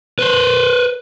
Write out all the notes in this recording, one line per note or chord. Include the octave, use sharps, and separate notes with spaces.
B4 C5